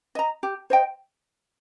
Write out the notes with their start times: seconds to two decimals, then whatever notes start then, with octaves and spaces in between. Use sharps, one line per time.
0.15 D#5 A#5
0.43 G4
0.70 C5 D#5 G5